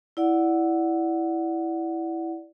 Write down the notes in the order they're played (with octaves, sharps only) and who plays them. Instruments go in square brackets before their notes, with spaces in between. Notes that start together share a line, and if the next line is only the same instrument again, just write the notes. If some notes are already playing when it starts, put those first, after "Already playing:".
[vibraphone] E4 D5 F#5